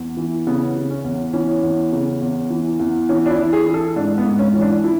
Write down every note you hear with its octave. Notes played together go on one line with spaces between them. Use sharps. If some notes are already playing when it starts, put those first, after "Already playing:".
Already playing: E2
E3
C#3 B3
C#3
C#4
E2
E3 C#4
E2
C#3
E2
E3
E2
E3 C#4
D4
E4
E3
G#4
E3
A4
G#2 D4
B3
G#2
C#4
E3
D4
E4